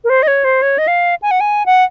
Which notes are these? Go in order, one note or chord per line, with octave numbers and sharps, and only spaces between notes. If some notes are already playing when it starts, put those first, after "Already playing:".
A#4
C5
D#5
C#5
C5
C#5
D#5
F5
G#5
F#5
G#5
F#5